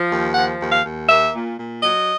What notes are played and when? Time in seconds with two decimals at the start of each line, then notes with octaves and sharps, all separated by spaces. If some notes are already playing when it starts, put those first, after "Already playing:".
Already playing: F3
0.10 D#2
0.35 F3 F#5
0.60 D#2
0.72 F5
0.84 D#2
1.09 A#3 E5
1.34 A#2
1.58 A#2
1.83 F#3 D#5